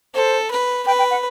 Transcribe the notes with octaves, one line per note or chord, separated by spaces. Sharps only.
A4 C5
B4
B4 G5
G5
F#5